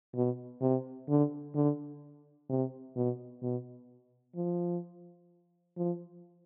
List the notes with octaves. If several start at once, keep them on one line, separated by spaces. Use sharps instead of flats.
B2
C3
D3
D3
C3
B2
B2
F3
F3